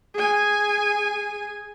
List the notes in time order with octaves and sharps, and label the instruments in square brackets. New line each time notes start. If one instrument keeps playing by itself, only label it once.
[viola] G#4 G#5